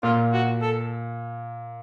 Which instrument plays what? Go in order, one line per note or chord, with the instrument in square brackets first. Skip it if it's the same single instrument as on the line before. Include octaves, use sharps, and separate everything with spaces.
[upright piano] A#2 [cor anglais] F4
[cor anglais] F#4
A4